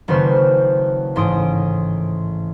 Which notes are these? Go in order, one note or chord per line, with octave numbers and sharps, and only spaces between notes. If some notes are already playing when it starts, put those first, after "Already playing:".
F#1 D#3 B4 C5 C#6 F6
A1 G#2 C6 D#6 D7